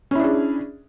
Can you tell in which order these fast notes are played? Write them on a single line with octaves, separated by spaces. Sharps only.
C#4 E4 D4 G#4